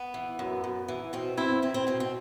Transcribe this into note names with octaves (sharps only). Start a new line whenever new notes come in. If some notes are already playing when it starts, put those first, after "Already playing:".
Already playing: B3
E3
F#2
F#2
E3
B2 C4
E2 C4 E4
E2 C4 E4
C4
B2 C4
C4